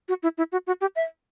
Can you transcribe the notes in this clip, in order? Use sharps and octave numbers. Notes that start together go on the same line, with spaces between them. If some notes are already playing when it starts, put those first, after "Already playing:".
F#4
E4
E4
F#4
F#4
G4
E5